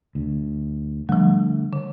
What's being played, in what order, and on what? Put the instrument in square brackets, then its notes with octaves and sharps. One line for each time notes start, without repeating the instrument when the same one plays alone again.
[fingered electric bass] D2
[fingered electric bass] D3 A3 [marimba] F3 G3
[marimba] D3